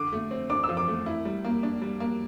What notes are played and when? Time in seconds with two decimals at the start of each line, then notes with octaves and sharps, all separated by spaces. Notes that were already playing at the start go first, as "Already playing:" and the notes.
Already playing: D3 D6
0.13 A3
0.31 C4
0.50 D4 D6
0.64 E6
0.69 F3
0.77 D6
0.88 A3
1.06 E4
1.25 G3
1.45 A#3
1.63 D4
1.82 G3
2.00 A#3